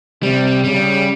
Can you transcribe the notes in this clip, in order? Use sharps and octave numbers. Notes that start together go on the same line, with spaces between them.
C3 G3
C#3 G3